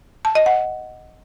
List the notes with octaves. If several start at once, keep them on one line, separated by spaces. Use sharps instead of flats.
A5
D#5
F#5